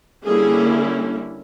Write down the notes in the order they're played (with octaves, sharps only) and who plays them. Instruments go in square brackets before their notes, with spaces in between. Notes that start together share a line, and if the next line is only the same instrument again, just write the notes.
[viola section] D3 G3 A#3 C#4 E4 G#4